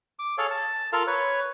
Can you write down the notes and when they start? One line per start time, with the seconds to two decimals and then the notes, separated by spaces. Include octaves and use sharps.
0.19 D6
0.38 G#4 A4 C#5 F5
0.51 A5
0.93 F4 A4 A#4 F5
1.07 B4 C#5